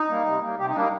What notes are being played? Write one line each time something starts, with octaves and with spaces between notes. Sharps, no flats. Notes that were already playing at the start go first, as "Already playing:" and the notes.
Already playing: D#4
G3 A#3
C3
G3 A#3
C3 G4
D#4
G3 A#3 D4
D#4